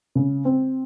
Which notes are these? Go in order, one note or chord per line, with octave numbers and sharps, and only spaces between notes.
C#3
C4